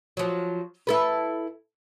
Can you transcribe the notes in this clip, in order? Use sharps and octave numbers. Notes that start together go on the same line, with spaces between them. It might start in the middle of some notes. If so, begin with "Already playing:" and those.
F3 F#3
E4 A4 B4